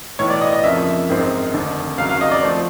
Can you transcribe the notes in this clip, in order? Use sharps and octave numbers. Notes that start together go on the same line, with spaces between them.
B1 A2 E3 C#5
D5
D#5
D#5
F#1 F2 C#3 F3 A#3 E5
G#1 F#2 D#3 G#3 C4
F1 D#2 D3
F1 D#2 C#3 F#3 F5
F5
D#5
D5
F3 A3 C4